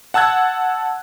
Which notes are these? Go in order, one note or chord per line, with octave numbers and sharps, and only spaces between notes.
F#5 A5 E6 F#6 G#6